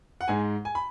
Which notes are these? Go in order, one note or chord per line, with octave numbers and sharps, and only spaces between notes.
F#5
G#2 G#3 G#5
G#5
B5